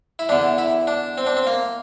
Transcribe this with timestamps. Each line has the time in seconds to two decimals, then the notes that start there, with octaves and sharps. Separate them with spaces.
0.19 E4
0.29 E2 D3 D4
0.58 E4
0.87 D4
1.18 C4
1.26 D4
1.37 C4
1.47 A#3